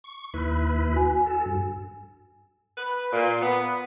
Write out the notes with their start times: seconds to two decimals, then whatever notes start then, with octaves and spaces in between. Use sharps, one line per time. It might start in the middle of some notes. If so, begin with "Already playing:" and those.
0.04 C#6
0.34 D#2 E4 B4
0.93 F#4 G#5
1.26 A4
1.46 G2
2.77 B4
3.12 A#2
3.42 B3